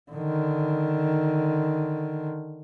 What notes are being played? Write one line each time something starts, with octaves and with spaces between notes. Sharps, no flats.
D3 D#3